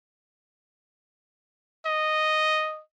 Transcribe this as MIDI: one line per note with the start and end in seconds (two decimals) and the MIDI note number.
1.86 2.81 75